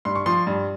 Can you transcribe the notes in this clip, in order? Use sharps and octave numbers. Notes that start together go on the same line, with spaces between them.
G2 C6
C#6
F3 C6
G2